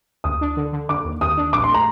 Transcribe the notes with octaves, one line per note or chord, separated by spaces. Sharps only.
D2 D#6
D4
D3
D3
D3 D6
D#2
D#2 D#6
D4
A#1 D6
C6
A3
A#5